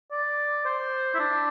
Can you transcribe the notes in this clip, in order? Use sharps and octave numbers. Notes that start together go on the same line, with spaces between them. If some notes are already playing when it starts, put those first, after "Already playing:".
D5
C5
E4
D4